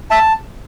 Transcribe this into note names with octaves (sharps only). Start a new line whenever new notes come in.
E5 A5